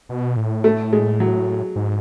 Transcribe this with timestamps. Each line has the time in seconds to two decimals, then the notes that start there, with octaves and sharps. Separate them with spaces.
0.09 B2
0.37 A2
0.64 A3
0.93 G#3
1.20 F#3
1.76 G#2